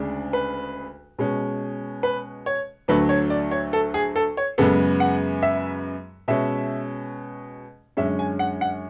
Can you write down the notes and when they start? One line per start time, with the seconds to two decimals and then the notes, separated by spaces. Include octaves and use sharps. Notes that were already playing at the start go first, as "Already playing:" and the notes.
Already playing: D2 C#3 G#3 D4
0.33 B4
1.19 B2 G#3 C#4
2.03 B4
2.46 C#5
2.88 D2 D3 F#3 A3 B4
3.09 C#5
3.30 D5
3.51 C#5
3.73 A4
3.94 G#4
4.16 A4
4.37 C#5
4.58 F#2 C#3 G#3 B3 A4
5.00 F#5
5.43 E5
6.28 B2 G#3 C#4 E5
7.97 F#2 D3 G#3 C#4 E5
8.19 G#5
8.39 F#5
8.61 F#5